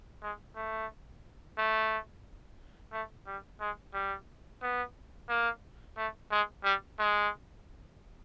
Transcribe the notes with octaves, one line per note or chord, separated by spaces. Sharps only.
G#3
A3
A3
A3
G3
G#3
G3
B3
A#3
A3
G#3
G3
G#3